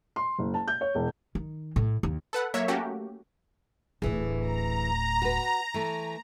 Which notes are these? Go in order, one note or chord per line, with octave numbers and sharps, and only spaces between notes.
C6
F#1
A5
G6
C#5
E1
D#3
A2
D#2
A4 B4 F#5
F#3 A#3 C#5 E5
A3 A#3 C#4 F#4 G4
D1 A2 E3 G#4
A#5
F#4 B4
E3 A3